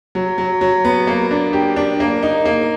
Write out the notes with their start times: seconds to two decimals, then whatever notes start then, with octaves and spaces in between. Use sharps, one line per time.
0.15 F#3
0.38 F#3
0.61 F#3
0.85 B3
1.07 A#3
1.31 D4
1.53 G4
1.76 D4
2.00 A#3
2.23 D#4
2.45 A#3